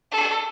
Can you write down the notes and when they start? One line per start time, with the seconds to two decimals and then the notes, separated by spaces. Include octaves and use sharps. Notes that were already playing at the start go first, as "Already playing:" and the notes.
0.11 A4